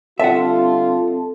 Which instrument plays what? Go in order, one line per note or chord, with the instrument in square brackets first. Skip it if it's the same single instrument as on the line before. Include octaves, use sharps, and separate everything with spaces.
[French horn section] D3 G3 F4 [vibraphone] C4 A4 A5 [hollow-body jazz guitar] E5 F#5